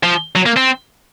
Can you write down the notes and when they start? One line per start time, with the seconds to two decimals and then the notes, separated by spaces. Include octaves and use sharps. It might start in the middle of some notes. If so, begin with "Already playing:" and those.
0.03 F3
0.35 F#3
0.46 A#3
0.57 C4